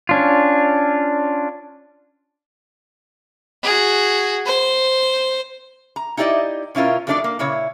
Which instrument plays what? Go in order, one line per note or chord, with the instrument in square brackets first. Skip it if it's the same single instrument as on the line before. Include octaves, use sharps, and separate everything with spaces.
[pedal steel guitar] C#4 D4 F4
[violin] F#4 G#4
C5
[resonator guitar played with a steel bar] A#5
D#4 E4 G4 D5 D#5
B2 C#4 E4 F4 A#4
F2 F#3 A3 D4 D#4 D5
A#3
A#2 C#3 E4 C#5